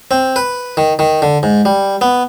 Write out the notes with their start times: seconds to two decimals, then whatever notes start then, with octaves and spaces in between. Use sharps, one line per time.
0.11 C4
0.36 B4
0.77 D#3
0.99 D#3
1.22 D3
1.43 G#2
1.65 G3
2.01 B3